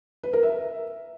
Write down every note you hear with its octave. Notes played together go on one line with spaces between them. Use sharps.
B4
A#4
E5